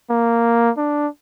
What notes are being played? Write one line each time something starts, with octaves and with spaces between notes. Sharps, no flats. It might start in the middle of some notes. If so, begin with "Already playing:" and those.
A#3
D4